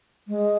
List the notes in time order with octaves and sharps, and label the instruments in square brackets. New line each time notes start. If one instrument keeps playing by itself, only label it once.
[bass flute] G#3